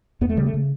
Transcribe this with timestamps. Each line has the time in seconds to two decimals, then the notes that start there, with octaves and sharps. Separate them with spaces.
0.21 E2 B3
0.29 A3
0.37 C#3 G3
0.46 A3
0.54 C#3